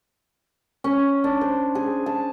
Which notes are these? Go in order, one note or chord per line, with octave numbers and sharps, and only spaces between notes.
C#4
D4
C5
G#4
A5